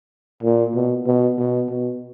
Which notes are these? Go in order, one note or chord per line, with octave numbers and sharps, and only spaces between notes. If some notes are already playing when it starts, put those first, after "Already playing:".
A#2
B2
B2
B2
B2